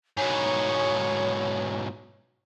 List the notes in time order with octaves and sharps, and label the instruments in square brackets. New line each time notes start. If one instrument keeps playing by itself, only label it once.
[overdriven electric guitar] G#2 B2 [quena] C#5